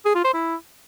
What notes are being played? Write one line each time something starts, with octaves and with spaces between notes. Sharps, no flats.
G#4
F4
C5
E4